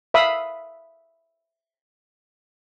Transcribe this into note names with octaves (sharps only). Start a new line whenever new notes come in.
E5 F5 B5 D#6